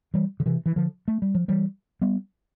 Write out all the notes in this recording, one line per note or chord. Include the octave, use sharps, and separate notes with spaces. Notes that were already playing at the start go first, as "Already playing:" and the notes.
E3 G3
D3
C3 E3
E3
D3 F3
A3
G3
F3
E3 G3
G3 B3